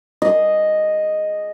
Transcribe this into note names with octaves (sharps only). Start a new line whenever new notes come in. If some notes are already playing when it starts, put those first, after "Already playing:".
G#4 D#5